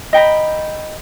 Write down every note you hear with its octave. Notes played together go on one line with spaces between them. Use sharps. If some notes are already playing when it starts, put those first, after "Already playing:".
D#5 G5 A#5 B5